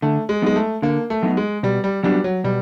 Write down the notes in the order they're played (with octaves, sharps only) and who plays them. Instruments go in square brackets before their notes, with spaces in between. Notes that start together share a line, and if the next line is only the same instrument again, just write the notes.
[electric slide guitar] D3 [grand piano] A3
[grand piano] G#3
[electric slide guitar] F#3 B3 D#4 [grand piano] G#3
[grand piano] A3
[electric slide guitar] D3 [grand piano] A#3
[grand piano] A3
[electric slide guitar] F#3 B3 D#4
[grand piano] G#3
[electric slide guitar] B2 [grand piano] G3
[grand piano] G3
[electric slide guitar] F#3 B3 D4 F#4 [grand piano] G3
[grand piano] F#3
[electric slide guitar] B2 [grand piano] G3